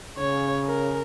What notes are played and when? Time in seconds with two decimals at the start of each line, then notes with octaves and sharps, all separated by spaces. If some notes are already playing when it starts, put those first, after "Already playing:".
0.18 C#3 C#5
0.66 A#4